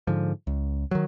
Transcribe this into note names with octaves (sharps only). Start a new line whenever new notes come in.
G#2 D3 F3
C#2
D#3 F#3